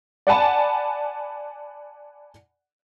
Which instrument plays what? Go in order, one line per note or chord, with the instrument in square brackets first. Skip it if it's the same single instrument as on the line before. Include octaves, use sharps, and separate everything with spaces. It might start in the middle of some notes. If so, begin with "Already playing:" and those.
[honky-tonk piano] D5 F#5 G#5 A5 B5